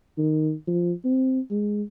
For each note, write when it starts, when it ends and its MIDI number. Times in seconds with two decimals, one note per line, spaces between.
0.18 0.53 51
0.67 0.93 53
1.05 1.40 60
1.50 1.83 56